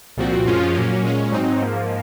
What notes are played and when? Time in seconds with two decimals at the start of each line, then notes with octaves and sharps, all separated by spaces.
0.17 C2 A#2 F3 C4 F#4
0.45 F#2 F3 G#3 C#4 F4
0.74 A#2 F#3 A#3 C#4
1.03 A#2 G#3 C#4
1.32 G#2 F#3 C4 D#4
1.60 G#2 F3 A#3